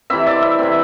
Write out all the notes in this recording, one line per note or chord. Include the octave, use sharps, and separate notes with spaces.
C3 E3 C4 E5
D5
E5
C3 E3 C4